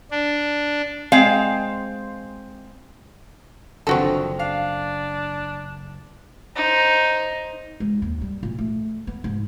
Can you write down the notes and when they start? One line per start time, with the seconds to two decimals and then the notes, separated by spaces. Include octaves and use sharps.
0.11 D4
1.12 G#3 C4 F5
3.87 F#1 D3 D#3 F3 C4 F#4 A4
4.39 D4 F5
6.56 D#4 C5
7.80 G#3
8.02 D#2
8.21 G3
8.43 A#2
8.59 A3
9.07 B3
9.24 G#2